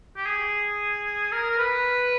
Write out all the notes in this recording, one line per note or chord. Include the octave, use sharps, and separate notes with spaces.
G4
G#4
A#4
A#4
B4